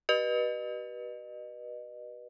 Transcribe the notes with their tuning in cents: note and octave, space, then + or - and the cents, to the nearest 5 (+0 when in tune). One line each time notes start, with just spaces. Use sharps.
G4 -45 B4 -25 D#5 -30